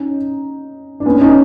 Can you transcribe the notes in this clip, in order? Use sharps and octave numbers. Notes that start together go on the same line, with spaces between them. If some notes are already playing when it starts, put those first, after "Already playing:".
Already playing: C#4 D#4
D4
B3 C#4
C#4 D#4